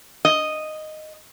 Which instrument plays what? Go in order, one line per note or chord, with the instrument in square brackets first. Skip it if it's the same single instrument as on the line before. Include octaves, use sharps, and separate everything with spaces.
[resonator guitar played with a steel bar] D#5